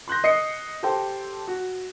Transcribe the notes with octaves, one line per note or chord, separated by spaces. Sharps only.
C6 F#6 G6 A#6
D#5 C7 C#7
G4 A4 C5 G5
F#4